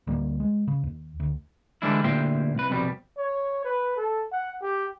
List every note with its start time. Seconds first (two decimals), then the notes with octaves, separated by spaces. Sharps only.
0.07 D2 G3 A#3
0.40 G#3
0.68 C#3
0.83 D#2
1.20 D2
1.82 D3 E3 G3 G#3 D4 E4
2.04 D2 A#2 E4 G4 C5 G5
2.55 C2 B4
2.70 C2 F2 B2 G3
3.18 C#5
3.64 B4
3.97 A4
4.32 F#5
4.62 G4